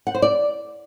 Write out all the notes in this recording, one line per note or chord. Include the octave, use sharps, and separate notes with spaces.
F#5
C5
D5